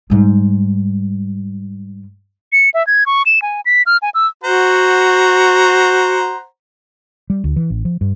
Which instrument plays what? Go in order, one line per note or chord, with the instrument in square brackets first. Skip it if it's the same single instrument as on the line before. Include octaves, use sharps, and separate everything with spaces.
[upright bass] G#2 G3
[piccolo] C#7
E5
G#6
C#6
E7
G#5
B6
F6
G#5
E6
[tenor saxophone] F#4 [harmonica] C5 F#5 A#5
[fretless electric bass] G3
D2
E3
A1
F3
G2